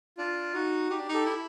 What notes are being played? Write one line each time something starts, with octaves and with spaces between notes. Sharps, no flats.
D4 F4
D#4 F#4
D#4 G4
D4
D#4 G4 A4
E4